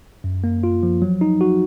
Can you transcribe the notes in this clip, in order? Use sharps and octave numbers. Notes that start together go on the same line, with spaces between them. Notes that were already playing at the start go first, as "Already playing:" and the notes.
F#2
A#3
F4
F3
F#3
D#4
F#4